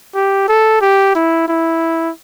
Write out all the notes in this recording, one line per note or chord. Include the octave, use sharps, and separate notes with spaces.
G4
A4
G4
E4
E4